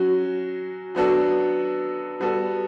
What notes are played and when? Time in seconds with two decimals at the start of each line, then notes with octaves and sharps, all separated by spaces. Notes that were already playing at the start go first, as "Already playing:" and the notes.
Already playing: F#3 C#4 F#4
0.95 F#3 B3 D4 F#4 A4
2.20 G3 B3 F#4 A4